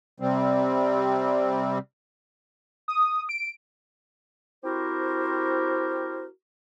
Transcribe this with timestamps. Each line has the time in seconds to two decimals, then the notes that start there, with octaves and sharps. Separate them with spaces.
0.20 C3 G3 C4
2.88 D#6
3.29 D7
4.64 C4 E4 F#4 G4 A#4 C5